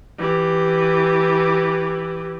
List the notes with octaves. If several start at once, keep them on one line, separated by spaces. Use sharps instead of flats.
E3 G4